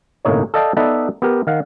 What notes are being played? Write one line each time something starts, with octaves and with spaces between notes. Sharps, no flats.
G1 C2 A2 A#3 D#4 C#5
A4 D5 D#5 F5 G5 A5
B3 D#4 A4 B4 D5 E5
B3 G4 A#4
D#3 F5 F#5